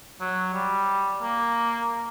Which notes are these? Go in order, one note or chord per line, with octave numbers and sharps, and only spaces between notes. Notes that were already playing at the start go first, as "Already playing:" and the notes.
F#3
G3
A#3